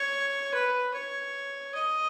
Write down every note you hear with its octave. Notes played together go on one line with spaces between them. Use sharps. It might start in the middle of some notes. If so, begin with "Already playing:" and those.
Already playing: C#5
B4
C#5
D#5